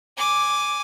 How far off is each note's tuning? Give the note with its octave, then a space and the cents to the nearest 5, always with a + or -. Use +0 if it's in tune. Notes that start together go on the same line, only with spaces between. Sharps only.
G#5 +0 D6 +0